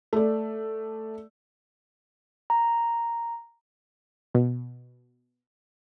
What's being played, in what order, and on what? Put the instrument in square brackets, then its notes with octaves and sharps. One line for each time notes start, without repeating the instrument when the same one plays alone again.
[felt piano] A3 D5
[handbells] A#5
[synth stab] B2